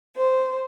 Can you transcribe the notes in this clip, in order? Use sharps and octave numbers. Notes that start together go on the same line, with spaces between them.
C5